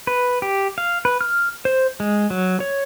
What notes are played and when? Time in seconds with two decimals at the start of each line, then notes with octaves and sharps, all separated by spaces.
0.07 B4
0.42 G4
0.78 F5
1.05 B4
1.21 F6
1.65 C5
2.00 G#3
2.30 F#3
2.60 C#5